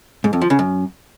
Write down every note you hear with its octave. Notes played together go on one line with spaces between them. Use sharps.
G#2
F2
F3
C#3
F#2